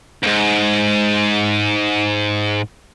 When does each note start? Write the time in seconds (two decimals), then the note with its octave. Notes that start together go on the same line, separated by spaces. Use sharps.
0.23 D2 G#2